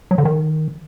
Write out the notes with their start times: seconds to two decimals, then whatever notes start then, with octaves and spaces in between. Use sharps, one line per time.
0.11 F#3
0.18 D3
0.25 D#3